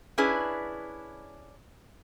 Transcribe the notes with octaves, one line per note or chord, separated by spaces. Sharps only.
C#4 D4 E4 G#4 B4